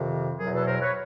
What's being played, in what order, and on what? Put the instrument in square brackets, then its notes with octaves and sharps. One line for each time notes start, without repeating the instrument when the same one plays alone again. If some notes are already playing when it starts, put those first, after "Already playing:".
Already playing: [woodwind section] F2 C3 D#3
E2 B2 F#3 G#4 A#4
A4 B4
A#4 C5
B4 C#5